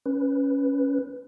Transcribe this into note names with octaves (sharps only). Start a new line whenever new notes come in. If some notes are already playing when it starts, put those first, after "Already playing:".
C#4 B4